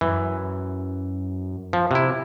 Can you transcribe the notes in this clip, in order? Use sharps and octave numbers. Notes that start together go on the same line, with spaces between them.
F#2 E3
F3
C3 E4